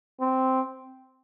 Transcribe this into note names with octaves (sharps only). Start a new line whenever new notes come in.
C4